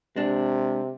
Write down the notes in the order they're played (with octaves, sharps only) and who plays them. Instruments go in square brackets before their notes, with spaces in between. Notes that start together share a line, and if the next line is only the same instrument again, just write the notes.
[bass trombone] C3 [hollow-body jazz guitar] G#3 D4